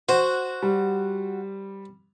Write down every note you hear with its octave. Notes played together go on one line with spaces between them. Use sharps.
F#4 C5
G3